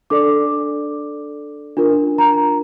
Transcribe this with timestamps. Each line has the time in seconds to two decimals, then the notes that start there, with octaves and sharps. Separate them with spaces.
0.10 D4 A4 D5 D6
1.77 D4 F4 A#4
2.18 A#5